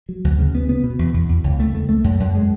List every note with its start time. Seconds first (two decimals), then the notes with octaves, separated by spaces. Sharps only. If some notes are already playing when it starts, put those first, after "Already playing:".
0.09 F#3
0.24 D2
0.39 C#3
0.55 B3
0.69 B3
0.84 B2
0.99 E2
1.14 E2
1.29 E2
1.44 C#2
1.59 A3
1.75 A3
1.89 A3
2.04 F#2
2.20 F#2
2.35 G#3